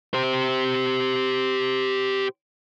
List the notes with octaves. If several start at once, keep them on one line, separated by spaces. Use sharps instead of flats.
G4 C5